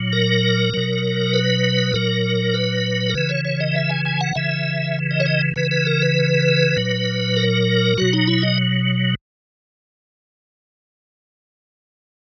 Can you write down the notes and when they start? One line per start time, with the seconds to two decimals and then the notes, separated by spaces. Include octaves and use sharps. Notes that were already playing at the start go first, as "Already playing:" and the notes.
Already playing: A#2 F#3
0.13 A#4
0.74 B2 F#3
1.33 B4
1.93 A#2 F#3 A#4
2.54 B4
3.10 A#4
3.14 C#3 E3 B4
3.29 C#5
3.45 C#5
3.60 D#5
3.75 E5
3.89 G#5
4.05 G#5
4.21 F#5
4.35 C#3 E3 E5
5.11 D#5
5.20 C#5
5.26 D#5
5.56 C#3 E3 B4
5.71 B4
5.87 A#4
6.02 B4
6.77 A#2 F#3
7.37 A#4
7.98 B2 F#3 F#4
8.13 D#4
8.27 E4
8.42 D#5